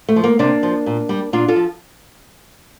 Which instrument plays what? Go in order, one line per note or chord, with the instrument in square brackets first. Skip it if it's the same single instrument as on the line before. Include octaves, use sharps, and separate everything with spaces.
[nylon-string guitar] A3
F3
A#3
C3 A#3 D4
F3
A#2
G3
A#2 D4 F4
F4 A4
F3